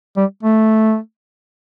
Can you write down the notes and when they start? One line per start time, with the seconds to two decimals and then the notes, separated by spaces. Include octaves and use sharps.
0.17 G3
0.43 A3